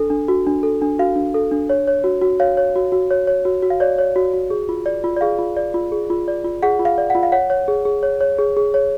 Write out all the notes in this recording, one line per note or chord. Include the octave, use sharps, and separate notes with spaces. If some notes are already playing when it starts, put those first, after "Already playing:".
Already playing: D4 A4
D4
F#4
D4
A4
D4
F#4 F5
D4
A4
D4
C#5
C#5
F#4
F#4
C#5 F5
C#5
F#4
F#4
C#5
C#5
F#4
F#4
F5
C#5 D5
C#5
F#4
F#4
G#4
F4
D5
F4
D5
G#4 F5
F4
D5
F4
G#4
F4
D5
F4
G#4 F#5
F4
F5
D5
F#5
F4
F5
C#5 F#5
C#5
G#4
G#4
C#5
C#5
G#4
G#4
C#5